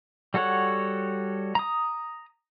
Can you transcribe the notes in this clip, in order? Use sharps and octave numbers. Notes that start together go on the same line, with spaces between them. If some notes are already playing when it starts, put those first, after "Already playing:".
G3 F#4 A4 C#5 F#5
A#5 D#6